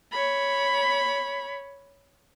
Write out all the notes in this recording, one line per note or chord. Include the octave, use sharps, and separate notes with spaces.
C#5 B5